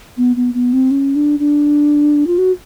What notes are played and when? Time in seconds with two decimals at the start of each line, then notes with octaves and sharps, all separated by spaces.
0.17 B3
0.36 B3
0.54 B3
0.73 C4
0.91 C#4
1.15 D4
1.39 D4
2.27 F4
2.38 F#4